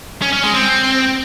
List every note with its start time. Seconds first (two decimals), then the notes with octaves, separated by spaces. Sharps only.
0.22 C#4
0.33 C#4
0.43 G#3
0.54 C4